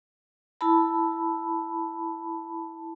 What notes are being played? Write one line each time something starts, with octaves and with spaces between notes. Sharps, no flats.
E4 A5 B5